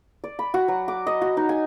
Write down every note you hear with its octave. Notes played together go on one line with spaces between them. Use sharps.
D5
B5
F#4
F#3
D6
D#5
F#4
D#4
G#5